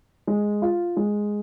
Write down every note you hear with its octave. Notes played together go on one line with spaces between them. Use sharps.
G#3
F4
G#3